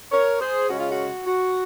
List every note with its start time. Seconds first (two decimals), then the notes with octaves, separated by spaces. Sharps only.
0.12 A#4 C#5
0.40 G#4 C5
0.69 C#3 G#3 C#4 F#4
0.79 F4
0.90 F#4
1.26 F#4